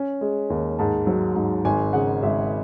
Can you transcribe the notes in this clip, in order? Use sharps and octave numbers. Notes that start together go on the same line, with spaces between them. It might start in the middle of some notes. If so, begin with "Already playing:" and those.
Already playing: C#4
G#3
D#2
G#2 A5
F#3
G#2
G#1 G#5
C#3 F#5
G#1 E5